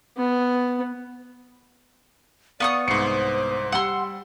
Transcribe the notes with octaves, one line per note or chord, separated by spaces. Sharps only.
B3
B3 D5 F5 C#6 D#6
C2 G#2 C5 C7 C#7
G3 F#5 C6 E6